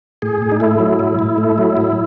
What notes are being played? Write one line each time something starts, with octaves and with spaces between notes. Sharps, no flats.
A2 G#4
A2
D#4
A3 E4
F#3
A2
A2
A3
F#3
A2